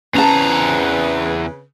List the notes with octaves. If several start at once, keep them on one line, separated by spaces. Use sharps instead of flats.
E2 C#3 C4 C#4 B4 A5 A#5